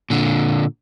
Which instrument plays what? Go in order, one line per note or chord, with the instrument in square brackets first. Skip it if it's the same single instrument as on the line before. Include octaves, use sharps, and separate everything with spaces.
[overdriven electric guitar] A#2 D3